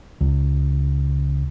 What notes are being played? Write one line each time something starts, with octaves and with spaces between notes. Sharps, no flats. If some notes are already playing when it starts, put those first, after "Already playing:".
C#2